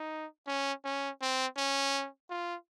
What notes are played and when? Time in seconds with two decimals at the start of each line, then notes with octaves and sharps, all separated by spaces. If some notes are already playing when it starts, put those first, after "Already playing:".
Already playing: D#4
0.47 C#4
0.84 C#4
1.21 C4
1.57 C#4
2.30 F4